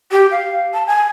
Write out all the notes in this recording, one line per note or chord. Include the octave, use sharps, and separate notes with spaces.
G4
F5
A5
G#5